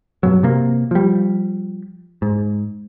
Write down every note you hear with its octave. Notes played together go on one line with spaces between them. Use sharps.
G2 B2 F#3
C3 A#3
F3 G3
G#2